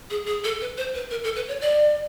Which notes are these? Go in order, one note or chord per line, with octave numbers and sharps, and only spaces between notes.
G#4
G#4
A4
B4
C5
B4
A#4
A4
B4
C#5
D5